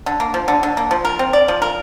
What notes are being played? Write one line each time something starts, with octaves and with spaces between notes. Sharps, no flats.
D3
A#3
F3
D3
D3
A#3
F3
A#4
C4
D5
F3
A#4